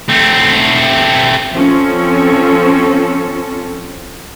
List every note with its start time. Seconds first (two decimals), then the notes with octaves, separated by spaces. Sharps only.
0.09 A3 C4
1.54 F3 C4 C#4 A4